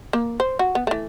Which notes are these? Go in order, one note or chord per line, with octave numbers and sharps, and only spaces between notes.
A#3
C5
F#4
B3
E3 A3